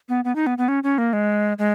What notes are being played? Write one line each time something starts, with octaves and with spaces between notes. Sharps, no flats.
B3
B3
D#4
B3
B3
C#4
C#4
A#3
G#3
G#3